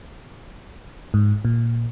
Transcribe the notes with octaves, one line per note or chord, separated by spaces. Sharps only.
G#2
A#2